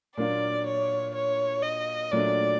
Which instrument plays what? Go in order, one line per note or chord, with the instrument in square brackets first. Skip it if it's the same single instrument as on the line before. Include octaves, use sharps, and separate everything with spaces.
[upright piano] A#2 F#3 A#3 D4 F4 [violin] D5
[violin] C#5
C#5
D#5
[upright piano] A#2 F#3 A3 D4 [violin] D5